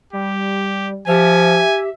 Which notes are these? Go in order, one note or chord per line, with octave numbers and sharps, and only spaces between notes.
G3 G4
F3 G4 E5 G#5